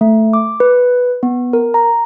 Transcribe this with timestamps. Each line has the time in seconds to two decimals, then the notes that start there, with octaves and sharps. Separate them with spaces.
0.01 A3
0.33 D6
0.60 B4
1.23 B3
1.53 A#4
1.74 A#5